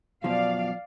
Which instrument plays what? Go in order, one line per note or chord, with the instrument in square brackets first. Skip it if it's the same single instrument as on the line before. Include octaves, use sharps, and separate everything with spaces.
[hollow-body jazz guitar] F#2 B2 F3 [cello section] D5 F5